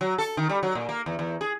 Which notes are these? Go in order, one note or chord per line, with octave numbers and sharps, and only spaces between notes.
F#3
A4
D#3
G3
F#3
A#2
A#3
E2
E2
G#4